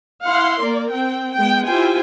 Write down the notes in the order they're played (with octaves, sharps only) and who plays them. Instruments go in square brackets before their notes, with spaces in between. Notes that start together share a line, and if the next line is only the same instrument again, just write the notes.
[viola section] E4 F5 F#5 C6
A#3 A#4 D5
C4 G5
G#3 B3 G5
E4 F4 G4 C5 G5 G#5